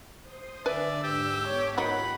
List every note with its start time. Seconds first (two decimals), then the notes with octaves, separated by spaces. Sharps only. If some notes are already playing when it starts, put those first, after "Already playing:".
0.20 C5 C6 D#6
0.66 D3 D4 B4 D5 E5 G#5
1.04 G#2 G4 E6
1.48 B3 A4 C#5
1.78 D#3 F#3 D#4 F4 G4 F#5 B5